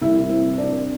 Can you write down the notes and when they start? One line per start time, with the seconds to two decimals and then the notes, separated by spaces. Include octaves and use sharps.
0.02 C2 E4 E5
0.29 C4
0.58 C4 D4 D5